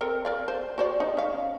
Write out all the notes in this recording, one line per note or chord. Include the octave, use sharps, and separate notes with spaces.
C4 A4 A#4
A#4 D5 F5
C5
F#4 C5 D5
D#4
C#4 F5